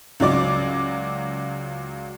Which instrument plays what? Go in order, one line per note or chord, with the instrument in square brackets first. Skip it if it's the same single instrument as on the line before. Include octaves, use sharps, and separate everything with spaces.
[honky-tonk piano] C#2 F#3 D5 D6